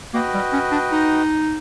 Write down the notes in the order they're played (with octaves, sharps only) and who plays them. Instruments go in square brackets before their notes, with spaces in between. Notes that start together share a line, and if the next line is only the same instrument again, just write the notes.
[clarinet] A#3 [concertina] F#4 B4 D#5 G5
[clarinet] G3
C#4
D4
D#4